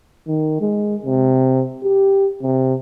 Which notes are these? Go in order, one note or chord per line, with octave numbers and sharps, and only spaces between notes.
D#3
G#3
C3
G4
C3